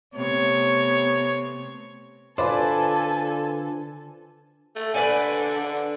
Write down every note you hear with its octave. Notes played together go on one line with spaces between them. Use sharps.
C3 A3 B3 C#5
D3 F4 A4 B4 C5 D5 G#5
A3
D3 B4 D5 G#5
D3